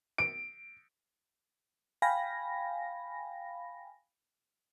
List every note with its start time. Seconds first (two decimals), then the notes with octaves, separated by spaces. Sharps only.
0.18 D7
2.02 F5 G5 G#5 B5 A#6